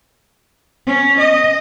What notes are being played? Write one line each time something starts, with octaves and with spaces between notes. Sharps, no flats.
C#4
D#5